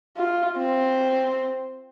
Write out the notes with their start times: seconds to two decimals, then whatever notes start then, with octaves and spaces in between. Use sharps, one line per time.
0.17 F4
0.57 C4